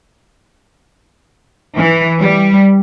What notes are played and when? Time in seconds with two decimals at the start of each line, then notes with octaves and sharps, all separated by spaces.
1.77 E3
2.20 G3